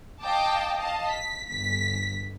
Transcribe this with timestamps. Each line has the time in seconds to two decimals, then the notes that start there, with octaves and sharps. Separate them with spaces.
0.22 D#5 F5 G5 A5 D6
0.77 D#5 F5 A5
1.09 B6
1.49 G1 B6